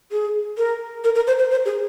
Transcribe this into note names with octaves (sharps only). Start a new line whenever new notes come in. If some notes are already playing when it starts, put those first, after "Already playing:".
G#4
A#4
A#4
A#4
C5
C5
C5
G#4